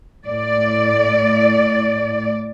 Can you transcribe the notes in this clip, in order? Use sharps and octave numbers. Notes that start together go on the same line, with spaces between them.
A2 D5